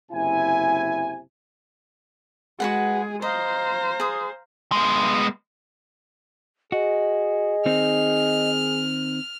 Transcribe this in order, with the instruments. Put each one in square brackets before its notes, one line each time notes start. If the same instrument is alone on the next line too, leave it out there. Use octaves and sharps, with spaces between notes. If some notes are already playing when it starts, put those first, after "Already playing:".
[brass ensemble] F#1 C3 E4 G#5
[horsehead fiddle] G#3 G#4 [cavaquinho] F#4 B4 F#5
[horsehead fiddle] C5 [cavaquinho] D#5 [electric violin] F5 A#5
[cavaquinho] G#4 D#6
[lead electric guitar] G#3 B3
[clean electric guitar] F#4 [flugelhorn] G#4 [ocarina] D#5
[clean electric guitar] D#3 C4 D#4 [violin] F6